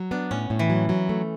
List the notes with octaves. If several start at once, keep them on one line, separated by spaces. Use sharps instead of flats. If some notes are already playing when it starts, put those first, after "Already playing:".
Already playing: F#3
B3 D4
A2 C#4
A2
E3
F#3
F#3
A3